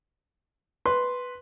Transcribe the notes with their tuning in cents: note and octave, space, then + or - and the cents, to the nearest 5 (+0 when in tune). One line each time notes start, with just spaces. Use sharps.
B4 +0 C6 +0